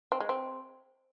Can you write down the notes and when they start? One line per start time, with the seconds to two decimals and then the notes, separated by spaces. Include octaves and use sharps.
0.12 C4
0.20 G#3
0.29 C4